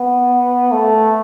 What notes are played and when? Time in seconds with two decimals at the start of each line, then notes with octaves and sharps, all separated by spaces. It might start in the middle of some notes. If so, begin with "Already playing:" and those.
Already playing: B3
0.72 A3